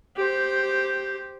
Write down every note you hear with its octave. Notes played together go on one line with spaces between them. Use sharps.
G4 C5